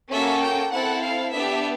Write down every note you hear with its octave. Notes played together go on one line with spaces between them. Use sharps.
A#3 C#4 F#4 A4 E5
G5
C4 E4 A4 F#5
F5
B3 D4 G4 E5